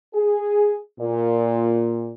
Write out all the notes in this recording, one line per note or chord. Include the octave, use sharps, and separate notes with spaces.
G#4
A#2